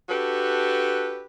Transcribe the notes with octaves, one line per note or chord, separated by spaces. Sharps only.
D4 F#4 G4 A4 B4